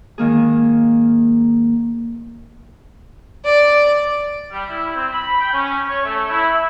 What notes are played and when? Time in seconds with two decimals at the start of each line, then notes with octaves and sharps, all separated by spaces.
0.18 G#2 D#3 A#3 G#4
3.45 D5
4.52 G3
4.70 E4
4.96 C4
5.13 B5
5.40 G5
5.53 C#4
5.89 C#5
6.05 A3
6.30 E4
6.54 E5